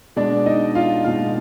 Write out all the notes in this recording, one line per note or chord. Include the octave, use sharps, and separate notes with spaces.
B2 G#3 D4 D5
D#4 D#5
F4 F5
B2 G#3 F4 F5